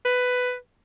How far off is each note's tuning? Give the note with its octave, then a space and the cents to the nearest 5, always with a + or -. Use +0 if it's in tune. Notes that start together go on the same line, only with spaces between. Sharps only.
B4 +10